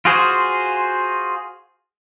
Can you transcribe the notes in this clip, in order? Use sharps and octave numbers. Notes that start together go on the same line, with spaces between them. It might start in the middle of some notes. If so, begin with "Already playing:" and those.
F4 F#4 G#4 C5